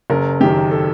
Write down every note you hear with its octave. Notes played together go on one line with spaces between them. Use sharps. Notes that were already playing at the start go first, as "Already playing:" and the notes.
F#1 A#4
F#2 D#3 G4
A4